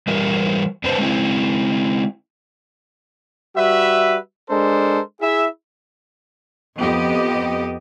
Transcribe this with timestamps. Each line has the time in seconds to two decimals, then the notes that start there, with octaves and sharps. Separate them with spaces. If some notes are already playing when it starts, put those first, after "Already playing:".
0.07 E3 G3 G4 A#4
0.84 F#2 C4 D4 B4 C5 A5
0.98 G#3 C4 E4
3.56 G3 F#4 B4 E5
4.50 G#3 D4 A4 A#4 C5
5.21 E4 G#4 E5
6.78 F2 B3 G4 D#5